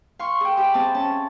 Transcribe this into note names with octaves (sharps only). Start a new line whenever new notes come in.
F5 C6 C#6
G#4 G5
G4 E5 B5
C4 G#4 A5
C#4 A5